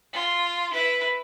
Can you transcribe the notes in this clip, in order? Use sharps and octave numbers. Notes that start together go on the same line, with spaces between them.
F4
E4 B4